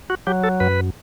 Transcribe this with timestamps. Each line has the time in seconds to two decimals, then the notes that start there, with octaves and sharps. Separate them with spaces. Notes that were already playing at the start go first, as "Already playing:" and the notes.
0.10 F#4
0.27 F#3 G4
0.44 A4
0.60 F#2 B4